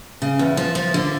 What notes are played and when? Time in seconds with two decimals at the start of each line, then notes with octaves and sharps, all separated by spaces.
0.22 C#3
0.39 E2
0.57 F3
0.75 F3
0.94 D3